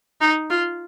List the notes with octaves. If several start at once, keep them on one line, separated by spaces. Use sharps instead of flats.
D#4
F4